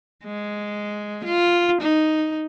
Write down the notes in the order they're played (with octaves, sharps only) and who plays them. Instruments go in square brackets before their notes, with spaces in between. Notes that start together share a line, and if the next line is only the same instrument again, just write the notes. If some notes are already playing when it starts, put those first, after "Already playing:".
[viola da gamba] G#3
F4
D#4